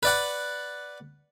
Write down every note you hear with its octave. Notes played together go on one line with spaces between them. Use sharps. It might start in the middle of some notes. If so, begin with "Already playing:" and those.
B4 D5 F#5